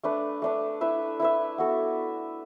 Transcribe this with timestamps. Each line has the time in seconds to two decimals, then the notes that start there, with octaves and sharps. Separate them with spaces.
0.03 A3 D4 B4
0.42 A3 D4 B4
0.81 E4 B4 E5
1.20 E4 B4 E5
1.58 B3 F#4 A4